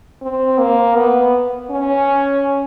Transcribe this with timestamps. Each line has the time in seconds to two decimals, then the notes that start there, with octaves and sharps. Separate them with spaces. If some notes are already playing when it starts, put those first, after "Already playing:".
0.22 C4
0.58 A#3
0.96 B3
1.70 C#4